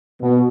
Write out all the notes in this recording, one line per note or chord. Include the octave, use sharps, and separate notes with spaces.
B2